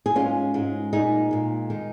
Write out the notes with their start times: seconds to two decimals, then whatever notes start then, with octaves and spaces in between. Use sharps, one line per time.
0.06 G#4
0.15 G#2 G#3 C#4 F4
0.54 G#2 G#3
0.93 A#2 G#3 D#4 G#4
1.31 A#2 G#3
1.70 D#3 G#3